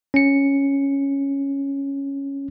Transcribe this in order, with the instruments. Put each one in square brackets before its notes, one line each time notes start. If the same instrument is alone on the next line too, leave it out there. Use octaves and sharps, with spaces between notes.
[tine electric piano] C#4 C#7